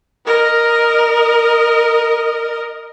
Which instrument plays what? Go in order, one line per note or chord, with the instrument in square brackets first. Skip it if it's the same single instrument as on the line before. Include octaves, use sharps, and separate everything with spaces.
[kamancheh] A#4 D#5